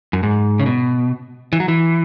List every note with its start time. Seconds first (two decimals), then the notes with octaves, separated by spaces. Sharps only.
0.13 F#2
0.23 G#2
0.59 C#3
0.66 B2
1.53 E3
1.60 F#3
1.68 E3